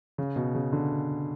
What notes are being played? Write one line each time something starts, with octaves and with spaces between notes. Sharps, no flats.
C#3
B2
C#3
D3